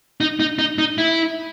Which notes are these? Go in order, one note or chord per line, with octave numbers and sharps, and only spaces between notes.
D#4
D#4
D#4
D#4
E4